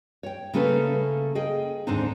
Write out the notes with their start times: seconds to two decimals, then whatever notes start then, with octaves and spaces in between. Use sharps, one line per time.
0.23 C#5 G5
0.53 C#3 A3 A#3 C#4 A4 B4
1.35 G#4 D#5 G5
1.87 D#2 G#2 D3 C4 D4 D#4